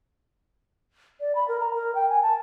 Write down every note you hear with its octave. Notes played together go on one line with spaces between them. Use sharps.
D5
B5
A#4
A#5
A#4
G5
G#5
A5